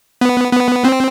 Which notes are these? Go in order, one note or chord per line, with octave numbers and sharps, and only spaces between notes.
B3
B3
C4